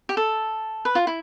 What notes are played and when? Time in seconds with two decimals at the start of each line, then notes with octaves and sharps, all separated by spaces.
0.09 G4
0.17 A4
0.85 B4
0.95 F4
1.07 E4